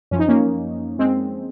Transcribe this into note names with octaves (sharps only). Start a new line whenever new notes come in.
F#2 F3 C#4
D#4
A#3 C#4
G#3 C4